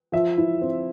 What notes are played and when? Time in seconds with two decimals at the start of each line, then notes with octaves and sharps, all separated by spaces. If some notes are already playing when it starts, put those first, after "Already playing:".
0.12 F3 E5
0.38 E4
0.62 C4